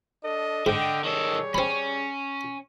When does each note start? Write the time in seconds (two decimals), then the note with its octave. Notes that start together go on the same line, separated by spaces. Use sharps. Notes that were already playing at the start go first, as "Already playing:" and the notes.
0.23 D4 A4 D#5
0.66 G#2 D3 D#5 G5
1.04 D#3 G3 G#4 A4 C#5
1.54 C4 C#4 B5